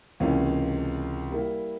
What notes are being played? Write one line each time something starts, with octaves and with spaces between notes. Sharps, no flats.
C#2 C3 E3 A#3 C#4
G3 A#3 E4 A#4